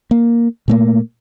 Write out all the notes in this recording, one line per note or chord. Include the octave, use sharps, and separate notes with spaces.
A#3
A#2 A3 A#3